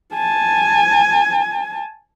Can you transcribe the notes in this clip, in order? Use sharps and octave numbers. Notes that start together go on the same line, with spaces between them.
G#5 A5